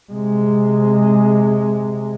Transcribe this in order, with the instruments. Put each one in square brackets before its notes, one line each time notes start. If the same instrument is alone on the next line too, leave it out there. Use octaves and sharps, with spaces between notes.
[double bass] C3 G#3